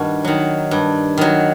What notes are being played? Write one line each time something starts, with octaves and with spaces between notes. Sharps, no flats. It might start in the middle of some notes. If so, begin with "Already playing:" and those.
Already playing: G2 D#3 E4 F#4
D#3 F#3
G2
D#3 F#3